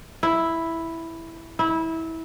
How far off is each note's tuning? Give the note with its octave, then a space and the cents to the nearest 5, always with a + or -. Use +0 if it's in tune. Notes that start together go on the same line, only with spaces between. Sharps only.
E4 +0
E4 -20